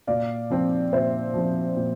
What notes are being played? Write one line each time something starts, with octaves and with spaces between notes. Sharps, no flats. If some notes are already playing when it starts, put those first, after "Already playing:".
A#2 D5 F5
F3 C4
A#2 C5 E5
F3 C4
A#2